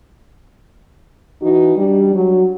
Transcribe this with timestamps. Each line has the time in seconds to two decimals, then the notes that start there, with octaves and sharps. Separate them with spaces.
1.41 E3 D#4 F#4
1.77 G3 D4
2.14 F#3